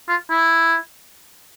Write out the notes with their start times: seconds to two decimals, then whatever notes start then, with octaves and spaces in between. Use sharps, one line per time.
0.08 F4
0.30 E4